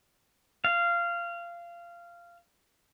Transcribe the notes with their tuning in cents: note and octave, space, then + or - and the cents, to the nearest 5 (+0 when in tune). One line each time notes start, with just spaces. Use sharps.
F5 -20